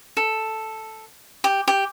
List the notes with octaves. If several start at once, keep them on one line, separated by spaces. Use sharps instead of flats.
A4
G4
G4